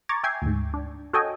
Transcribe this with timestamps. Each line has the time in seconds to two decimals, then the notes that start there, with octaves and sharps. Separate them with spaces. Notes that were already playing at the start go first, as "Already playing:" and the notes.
0.09 A#5 C#6 D6 G#6 A6
0.23 E5 G5 G#5 G#6 C7
0.42 D2 G#2
0.74 D4
1.13 F#4 A4 C#5 D#5 G5 G#5